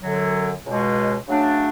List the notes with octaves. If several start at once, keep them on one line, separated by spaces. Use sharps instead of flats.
F#2 D3 F#3
C#2 B2 G#3
C#3 F#3 A3 D4